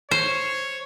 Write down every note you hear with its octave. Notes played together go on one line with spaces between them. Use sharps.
C5 C#5